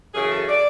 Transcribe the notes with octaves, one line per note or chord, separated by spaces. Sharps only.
F#2 C#3 E3 G#4
A4
D5